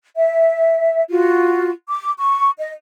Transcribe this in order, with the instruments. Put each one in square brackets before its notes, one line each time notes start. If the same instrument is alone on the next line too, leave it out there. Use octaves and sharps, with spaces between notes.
[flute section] E5
F4 F#4
D6
C#6
D#5